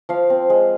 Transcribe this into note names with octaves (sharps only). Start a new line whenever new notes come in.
F3 F5
C4
G#3